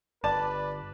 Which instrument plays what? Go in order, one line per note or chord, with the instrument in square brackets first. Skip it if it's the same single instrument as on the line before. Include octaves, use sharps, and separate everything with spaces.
[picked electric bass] G1 [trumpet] B4 [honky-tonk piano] D5 [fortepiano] A5